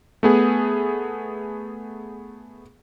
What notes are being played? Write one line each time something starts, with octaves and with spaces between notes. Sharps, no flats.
A3 B3 G#4